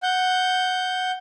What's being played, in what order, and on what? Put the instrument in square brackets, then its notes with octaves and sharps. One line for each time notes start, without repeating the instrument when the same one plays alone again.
[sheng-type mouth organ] F#5 G6